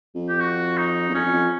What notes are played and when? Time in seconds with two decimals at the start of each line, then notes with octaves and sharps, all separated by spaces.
0.15 F2
0.29 G4
0.40 F#4
0.77 D#4
1.10 E2
1.14 F2 C#4
1.33 F2